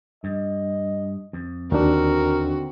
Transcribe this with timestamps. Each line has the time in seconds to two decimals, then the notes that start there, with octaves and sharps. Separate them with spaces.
0.24 G2 D#5
1.33 F2
1.72 D#2 D3 C4 D4 D#4 F#4 A#4